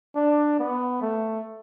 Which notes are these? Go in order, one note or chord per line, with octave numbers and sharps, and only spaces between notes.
D4
B3
A3